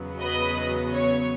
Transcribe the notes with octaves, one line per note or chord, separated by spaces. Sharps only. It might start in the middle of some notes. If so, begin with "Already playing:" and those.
Already playing: E2 C#3 F#3 B3
B4 D#5
C#5